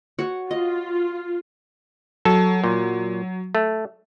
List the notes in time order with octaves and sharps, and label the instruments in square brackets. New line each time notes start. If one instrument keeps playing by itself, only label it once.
[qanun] F#4 C#5 F#5
[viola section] F4 [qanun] D#5
[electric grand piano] F#3 [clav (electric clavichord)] A4
[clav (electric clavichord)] A#2
A3